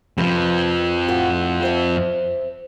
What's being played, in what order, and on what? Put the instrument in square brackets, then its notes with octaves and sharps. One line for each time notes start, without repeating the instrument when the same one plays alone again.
[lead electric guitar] F2 F3 [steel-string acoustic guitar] C3 B4
[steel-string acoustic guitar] A2 F4 F#4
C5 E5